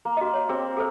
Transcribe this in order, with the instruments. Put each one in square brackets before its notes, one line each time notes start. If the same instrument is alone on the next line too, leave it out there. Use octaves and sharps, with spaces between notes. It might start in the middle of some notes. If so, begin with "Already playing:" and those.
[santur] A#3
[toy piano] F#4 D#5
C#5
[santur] C4 [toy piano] G#4
[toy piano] G#4 A4 C5